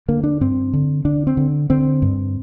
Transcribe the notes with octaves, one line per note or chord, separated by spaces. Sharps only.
D3 A#3
D4
G2 C4
D3
D3 D4
C4
D3
D3 C4
G2